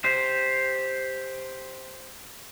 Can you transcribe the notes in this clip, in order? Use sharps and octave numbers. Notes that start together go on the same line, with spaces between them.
G4 C5